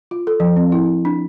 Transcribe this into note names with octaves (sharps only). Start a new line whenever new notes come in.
F4
A4
F3
C4
E4
D4